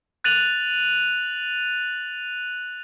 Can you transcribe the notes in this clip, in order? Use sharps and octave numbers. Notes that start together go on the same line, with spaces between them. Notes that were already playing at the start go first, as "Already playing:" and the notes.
F#6 A6 D#7 F7 F#7